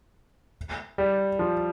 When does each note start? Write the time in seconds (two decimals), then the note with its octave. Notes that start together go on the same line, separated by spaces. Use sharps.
0.98 G3
1.39 F3